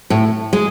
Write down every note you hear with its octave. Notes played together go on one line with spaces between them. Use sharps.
A2
G#3